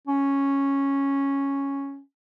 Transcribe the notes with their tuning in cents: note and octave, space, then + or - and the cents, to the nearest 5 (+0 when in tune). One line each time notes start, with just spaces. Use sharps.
C#4 -5